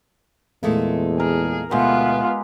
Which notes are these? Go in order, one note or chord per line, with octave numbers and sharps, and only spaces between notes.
E2 A#2 G#3 A3
G#4 A#4
D2 B2 G#3 B3 F4 G4